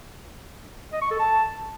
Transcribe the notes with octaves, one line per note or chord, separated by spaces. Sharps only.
D#5
C#6
A4
A5